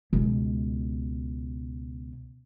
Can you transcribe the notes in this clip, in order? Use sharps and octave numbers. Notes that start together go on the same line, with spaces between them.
C#2 B2